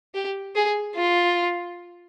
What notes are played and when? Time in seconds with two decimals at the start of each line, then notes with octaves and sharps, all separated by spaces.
0.14 G4
0.55 G#4
0.96 F4